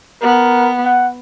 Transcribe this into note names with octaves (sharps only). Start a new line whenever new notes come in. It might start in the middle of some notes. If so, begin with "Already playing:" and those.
B3 A#4
F#5